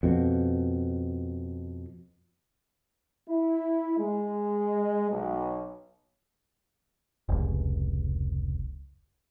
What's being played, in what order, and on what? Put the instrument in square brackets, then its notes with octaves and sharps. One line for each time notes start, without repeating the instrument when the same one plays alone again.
[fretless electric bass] F2 B2
[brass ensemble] E4
G#3
B1
[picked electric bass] F1 C#2